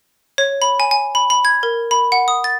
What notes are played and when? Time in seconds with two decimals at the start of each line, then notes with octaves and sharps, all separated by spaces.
0.38 C#5
0.62 B5
0.80 G#5
0.91 G#5
1.15 B5
1.30 B5
1.45 G#6
1.63 A#4
1.91 B5
2.12 F#5
2.28 D#6
2.44 A6